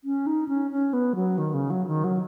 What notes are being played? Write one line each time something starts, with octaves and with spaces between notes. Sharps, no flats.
C#4
D#4
C#4
C#4
B3
F#3
D#3
C#3
F#3
D#3
F#3